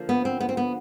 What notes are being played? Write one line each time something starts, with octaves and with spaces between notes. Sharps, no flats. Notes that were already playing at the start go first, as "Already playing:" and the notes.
Already playing: D3 F3 A#3
B3
C4
B3
C4
B3